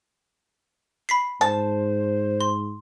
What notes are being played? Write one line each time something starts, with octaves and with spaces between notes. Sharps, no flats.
B5 B6 C7
G#2 C5 A5
C6